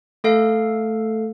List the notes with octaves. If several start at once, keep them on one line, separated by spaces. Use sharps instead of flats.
A3 A4 F5